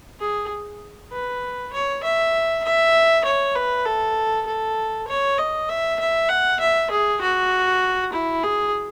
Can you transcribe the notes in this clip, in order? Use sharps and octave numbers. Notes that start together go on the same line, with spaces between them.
G#4
B4
C#5
E5
E5
C#5
B4
A4
A4
C#5
D#5
E5
E5
F#5
E5
G#4
F#4
E4
G#4